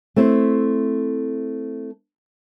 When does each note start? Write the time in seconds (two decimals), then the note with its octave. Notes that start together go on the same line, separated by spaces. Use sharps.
0.16 A3 C4 E4 C5